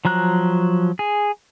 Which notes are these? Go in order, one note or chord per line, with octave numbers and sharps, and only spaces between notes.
F3 F#3 A#5 F#6
G#4